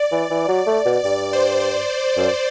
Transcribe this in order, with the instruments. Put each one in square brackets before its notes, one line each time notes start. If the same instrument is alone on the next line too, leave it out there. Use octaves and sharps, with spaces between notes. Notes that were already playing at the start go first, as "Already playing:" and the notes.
Already playing: [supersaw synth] D5
[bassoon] E3
E3
F#3
A3
B2
[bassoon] G2 [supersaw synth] D5
[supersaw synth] C5
C5
[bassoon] F#2